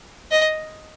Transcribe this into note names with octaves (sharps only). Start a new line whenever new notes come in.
D#5